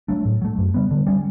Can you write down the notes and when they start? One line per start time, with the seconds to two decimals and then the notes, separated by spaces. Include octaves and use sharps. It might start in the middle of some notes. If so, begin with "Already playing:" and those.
0.08 F#3 A3 D4
0.25 A2
0.42 F#3 A3
0.58 F#2
0.74 C#3 G3 B3
0.91 D3
1.07 G3 C#4